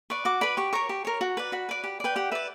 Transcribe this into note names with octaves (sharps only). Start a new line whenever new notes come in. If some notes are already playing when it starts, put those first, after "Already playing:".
B4 D5 C#6
F#4 D6
B4 D5 B5
G4 C#6
A#4 C#5 C#6
G4
A#4 C#5
F#4
B4 D5
F#4 B5
B4 D5
G4
B4 D5 G5
G4 F#5
B4 D5 E5